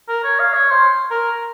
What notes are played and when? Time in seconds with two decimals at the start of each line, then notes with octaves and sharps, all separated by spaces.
0.08 A#4
0.24 C#5
0.39 F5
0.54 C#5
0.70 C5
1.11 A#4